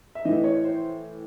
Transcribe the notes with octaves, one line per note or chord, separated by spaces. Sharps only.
E5
A2 E3 D#5
C#5
C5